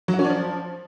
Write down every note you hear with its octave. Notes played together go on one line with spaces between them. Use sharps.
F#3
F#4
C#4
D4
F3